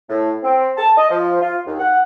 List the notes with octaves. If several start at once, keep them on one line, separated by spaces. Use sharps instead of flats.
A2
C4
A5
D#5
F3
F4
D#2
F#5